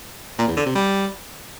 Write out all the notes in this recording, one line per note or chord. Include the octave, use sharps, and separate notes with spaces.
A#2
E2
D3
C3
G3